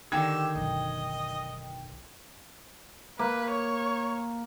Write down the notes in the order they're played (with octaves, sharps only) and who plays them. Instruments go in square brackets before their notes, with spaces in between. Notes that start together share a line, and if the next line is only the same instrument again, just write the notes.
[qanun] D3 D#3 D#4 [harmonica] G4 E6 [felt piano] G5 G#6
[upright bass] F#1 B1 [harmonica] D#5
[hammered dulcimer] A#3 [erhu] B4
[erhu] C#5